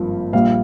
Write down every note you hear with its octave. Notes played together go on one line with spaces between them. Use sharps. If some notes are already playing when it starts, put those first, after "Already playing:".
Already playing: G#1 G2 F3 A#3
A#1 A#2 G3 F5